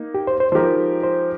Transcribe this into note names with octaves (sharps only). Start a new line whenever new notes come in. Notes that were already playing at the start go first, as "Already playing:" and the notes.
Already playing: A#3 D#4
G4
C5
C5
F3 G#3 D#4 G4 A#4 C5
C5